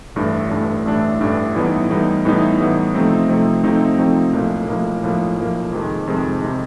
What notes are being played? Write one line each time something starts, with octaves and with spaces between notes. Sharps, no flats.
A1 G2 E3 A3 D4
A1 G2 E3 A3 D4
A1 G2 E3 A3 D4
A1 G2 E3 A3 D4
A2 E3 G3 B3 D#4
A2 E3 G3 B3 D#4
A2 E3 G3 B3 D#4
A2 E3 G3 B3 D#4
C3 F3 A3 C4 D#4
C3 F3 A3 C4 D#4
C3 F3 A3 C4 D#4
C3 F3 A3 C4 D#4
B1 A2 F3 A#3
B1 A2 F3 A#3
B1 A2 F3 A#3
B1 A2 F3 A#3
F2 C3 D#3 G#3
F2 C3 D#3 G#3
C3 D#3 G#3